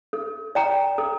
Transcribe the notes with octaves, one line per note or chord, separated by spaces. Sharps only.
A4
D5 G5 A#5
A4